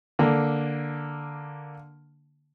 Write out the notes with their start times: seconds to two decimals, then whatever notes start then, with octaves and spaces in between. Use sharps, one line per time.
0.19 D3 A#3